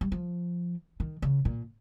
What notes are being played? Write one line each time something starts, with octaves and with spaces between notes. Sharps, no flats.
G3
F3
D#3
C#3
A#2